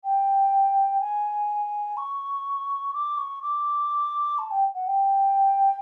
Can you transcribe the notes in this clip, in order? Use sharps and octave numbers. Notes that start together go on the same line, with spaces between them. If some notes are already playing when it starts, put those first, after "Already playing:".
G5
G#5
C#6
D6
C#6
D6
A5
G5
F#5
G5